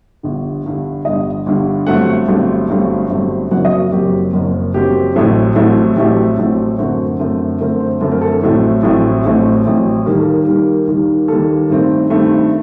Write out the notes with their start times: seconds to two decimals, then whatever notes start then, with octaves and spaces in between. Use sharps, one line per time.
0.23 G1 G2 D3
0.64 G1 G2 D3
1.05 G1 G2 D3 D#5
1.46 G1 G2 D3
1.87 G1 G2 F#3 A3 C4 F#5
2.28 G1 G2 F#3 A3 C4
2.68 G1 G2 F#3 A3 C4
3.10 G1 G2 F#3 A3 C4
3.51 F#1 F#2 F#3 C4 F#5
3.65 D#5
3.78 F#4
3.91 F#1 F#2 F#3 C4 G4
4.33 F#1 F#2 F#3 C4
4.74 F#1 F#2 F#3 C4 G4
5.14 A1 A2 F#3 A3 C4
5.55 A1 A2 F#3 A3 C4
5.96 A1 A2 F#3 A3 C4 G4
6.38 A1 A2 F#3 A3 C4
6.78 F#2 D3 A3 C4 F#4
7.20 F#2 D3 A3 C4
7.61 F#2 D3 A3 C4 A#4
7.80 C5
8.01 F#2 D3 A3 C4 A4
8.12 A#4
8.21 A4
8.32 A4
8.42 A1 A2 F#3 A3 C4
8.83 A1 A2 F#3 A3 C4
9.24 A1 A2 F#3 A3 C4 F#4
9.65 A1 A2 F#3 A3 C4
10.06 D#2 D#3 G3 A#3 G4
10.19 A4
10.33 A#4
10.47 D#2 D#3 G3 A#3 A#4
10.87 D#2 D#3 G3 A#3
11.28 D#2 D#3 G3 A#3 A4
11.70 G2 D#3 A3 C4
12.10 G2 D#3 A3 C4